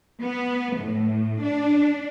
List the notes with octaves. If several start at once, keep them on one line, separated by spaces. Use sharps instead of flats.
B3
A2
D4